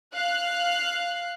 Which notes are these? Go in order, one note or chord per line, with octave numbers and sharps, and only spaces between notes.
F5 F#6